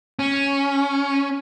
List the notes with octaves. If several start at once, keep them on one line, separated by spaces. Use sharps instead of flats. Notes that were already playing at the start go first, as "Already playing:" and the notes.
C#4